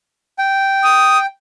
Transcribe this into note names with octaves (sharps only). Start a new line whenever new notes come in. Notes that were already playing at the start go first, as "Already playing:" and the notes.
G5
D#6